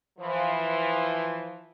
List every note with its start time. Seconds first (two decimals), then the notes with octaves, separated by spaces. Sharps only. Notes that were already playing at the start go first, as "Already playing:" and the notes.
0.19 E3 F3